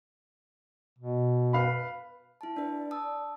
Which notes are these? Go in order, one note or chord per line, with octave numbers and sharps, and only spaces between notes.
B2
B4 F5 B5
E4 A5
D4 B4 D5
A5 D#6 E6